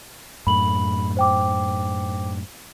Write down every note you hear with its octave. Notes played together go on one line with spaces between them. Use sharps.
F#2 A2 B5 F#7
C5 G5 D6